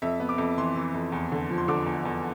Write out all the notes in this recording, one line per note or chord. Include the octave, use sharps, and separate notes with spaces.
F2 E5
B3
D6
F2
E3 C6
E3
F2
E2
D3
F3
C6
D3 D6
E2
E2